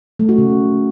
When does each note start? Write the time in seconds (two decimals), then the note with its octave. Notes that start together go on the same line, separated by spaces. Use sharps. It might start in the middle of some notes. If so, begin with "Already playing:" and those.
0.19 A3
0.29 F#4
0.38 C#3